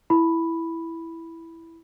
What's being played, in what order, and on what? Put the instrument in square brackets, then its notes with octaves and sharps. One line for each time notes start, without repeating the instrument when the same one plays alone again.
[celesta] E4 B5